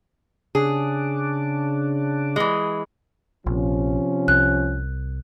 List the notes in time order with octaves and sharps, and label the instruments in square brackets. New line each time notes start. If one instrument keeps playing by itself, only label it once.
[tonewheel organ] C#3 D4 [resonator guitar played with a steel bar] G#4
[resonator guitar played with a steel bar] E3 G#3
[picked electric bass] A#1 [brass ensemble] C3 F3 C#4
[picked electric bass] C2 [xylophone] F#6